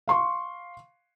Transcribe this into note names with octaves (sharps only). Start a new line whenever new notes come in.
F5 C6 C#6